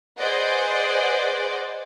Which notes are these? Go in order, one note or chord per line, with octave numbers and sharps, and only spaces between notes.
G#4 B4 C5 D5 D#5 F#5